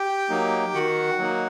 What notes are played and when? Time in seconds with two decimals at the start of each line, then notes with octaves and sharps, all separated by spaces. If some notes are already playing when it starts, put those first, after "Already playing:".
Already playing: G4 G5
0.30 F#3 A#3 D#4
0.74 D#3 F#4 F#5
1.19 F#3 A#3 D#4